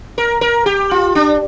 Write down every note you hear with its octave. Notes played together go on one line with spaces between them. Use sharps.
A#4
A#4
G4
F4
D4